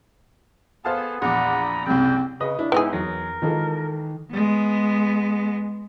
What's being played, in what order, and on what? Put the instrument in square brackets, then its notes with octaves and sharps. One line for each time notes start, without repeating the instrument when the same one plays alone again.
[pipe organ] B3 G#4 [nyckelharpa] A4 [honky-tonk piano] C5 F5 A5
[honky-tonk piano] A#1 E2 D6 [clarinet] F#5 [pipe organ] A#5 D#6 [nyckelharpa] B5
[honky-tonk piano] F#1 C2 [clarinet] C4 [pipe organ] G5
[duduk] C#3 [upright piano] B4 D#5
[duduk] D4 [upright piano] E4
[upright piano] G#2 [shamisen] B3 D#4 G#4 [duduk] E4
[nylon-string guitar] E2 [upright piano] F#3 [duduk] A#4
[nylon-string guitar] D#3 F4 A4 [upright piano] E3 G#3
[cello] G#3 B3